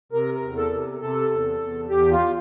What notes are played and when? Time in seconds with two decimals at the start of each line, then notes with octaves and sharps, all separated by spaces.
0.12 C3 A#4
0.34 A#4
0.42 E2
0.57 A4
0.72 C3
1.02 C3 A4
1.31 E2
1.61 E2
1.90 E2 G4
2.12 F4